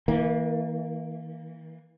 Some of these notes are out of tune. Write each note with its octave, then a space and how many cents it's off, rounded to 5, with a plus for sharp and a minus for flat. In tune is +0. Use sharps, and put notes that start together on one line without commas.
E3 -35 A#3 +0